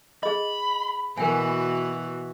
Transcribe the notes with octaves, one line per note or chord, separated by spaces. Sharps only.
G#4 D#5 B5
B2 E3 F#4 A#4 G5 G#5